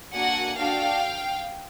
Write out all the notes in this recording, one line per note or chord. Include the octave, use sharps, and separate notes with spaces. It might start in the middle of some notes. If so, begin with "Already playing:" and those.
A#3 D4 F#4 A4 F#5 G#5
D4 F#4 A4 F5 G5